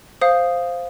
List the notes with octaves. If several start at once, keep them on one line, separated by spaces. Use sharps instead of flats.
C5 F5 D#6